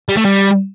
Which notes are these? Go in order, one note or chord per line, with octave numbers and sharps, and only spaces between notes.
G3
A3
G3